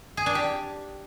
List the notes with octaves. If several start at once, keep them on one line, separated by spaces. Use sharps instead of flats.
G#4
D4
G4